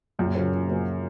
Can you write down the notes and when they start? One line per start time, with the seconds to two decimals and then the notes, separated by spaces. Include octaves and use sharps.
0.19 C#2 F#2 A#2
0.35 C#3 F#3 A#3 C#4
0.52 C#2
0.68 C#3 F#3 A#3 C#4